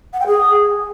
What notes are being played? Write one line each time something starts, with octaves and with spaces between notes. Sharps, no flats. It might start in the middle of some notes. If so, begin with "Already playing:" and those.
F#5
G5
G#4